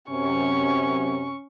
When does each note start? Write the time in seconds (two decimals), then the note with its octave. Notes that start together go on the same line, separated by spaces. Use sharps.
0.10 F#2 C3 C#4 C#6